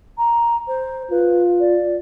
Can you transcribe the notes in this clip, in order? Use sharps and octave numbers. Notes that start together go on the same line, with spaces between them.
A#5
C5
F4 B4
D5